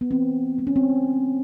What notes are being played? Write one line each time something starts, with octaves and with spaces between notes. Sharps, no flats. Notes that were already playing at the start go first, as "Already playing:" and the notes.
B3
E3 C4
G#3 B3 C4
C#4
C4